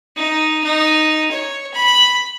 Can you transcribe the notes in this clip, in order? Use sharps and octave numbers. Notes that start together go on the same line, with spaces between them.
D#4
D#4
C#5
B5